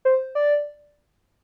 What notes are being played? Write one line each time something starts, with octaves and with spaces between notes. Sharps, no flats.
C5
D5